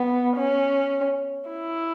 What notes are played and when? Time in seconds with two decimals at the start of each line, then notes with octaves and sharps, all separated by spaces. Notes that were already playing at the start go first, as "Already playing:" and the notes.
Already playing: B3
0.37 C#4
1.50 E4